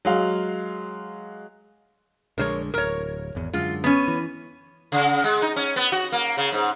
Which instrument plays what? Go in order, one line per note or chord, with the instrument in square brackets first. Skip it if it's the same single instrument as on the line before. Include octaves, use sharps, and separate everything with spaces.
[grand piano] F#3 G#3 F5
[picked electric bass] A#1 D3 G#3 [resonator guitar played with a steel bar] A#4 C5 C#5
[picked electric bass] D1 [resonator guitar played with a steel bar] A#4 C#5
[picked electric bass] G#1 E2
[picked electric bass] F#2 D3 G#3 [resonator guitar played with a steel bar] F4
[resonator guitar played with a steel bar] B3 C#4
[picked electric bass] E3
[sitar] C#3
G#3
D#4
C#4
B3
F#4
A#3
C#3
G#2